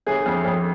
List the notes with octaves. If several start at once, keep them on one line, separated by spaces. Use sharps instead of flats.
G1 G#4
F2
F2